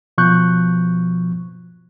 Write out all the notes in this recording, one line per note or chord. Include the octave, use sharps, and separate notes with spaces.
B2 F3 C#6 F#6 G6